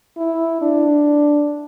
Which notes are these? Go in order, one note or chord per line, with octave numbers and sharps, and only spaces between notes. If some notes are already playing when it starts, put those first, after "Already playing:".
E4
D4